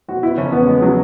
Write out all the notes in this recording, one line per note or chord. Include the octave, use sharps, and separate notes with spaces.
B1 F#4
B2 E4
F#1 C#4
E2 B3
F#1 G#3
F#3